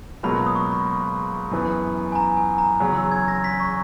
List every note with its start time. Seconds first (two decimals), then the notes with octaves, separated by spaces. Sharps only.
0.23 C#2 B2 F#3 A#3 B5
0.46 D#6
0.55 C#6
0.72 B5
1.51 F#2 E3 B3
2.12 G#5
2.15 A#5
2.37 G#5
2.58 A#5
2.80 E2 C#3 F#3 C#4 F#4
2.97 E6
3.11 G#6
3.28 A#6
3.44 B6
3.60 C#6